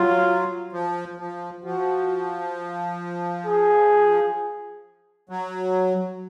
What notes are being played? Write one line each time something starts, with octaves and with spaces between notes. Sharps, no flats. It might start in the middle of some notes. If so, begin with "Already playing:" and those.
Already playing: F#3 F4
F3
F3
F3 F#4
G#4
F#3